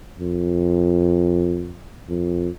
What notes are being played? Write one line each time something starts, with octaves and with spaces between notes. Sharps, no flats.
F2
F2